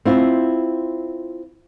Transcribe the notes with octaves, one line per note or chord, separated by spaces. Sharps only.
C4 E4 F4